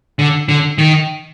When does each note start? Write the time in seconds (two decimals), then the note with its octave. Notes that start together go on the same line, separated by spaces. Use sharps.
0.19 D3
0.48 D3
0.78 D#3